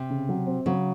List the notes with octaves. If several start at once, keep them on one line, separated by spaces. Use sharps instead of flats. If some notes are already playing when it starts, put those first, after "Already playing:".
Already playing: C3
C#3
F#3
C4
C#3 F#3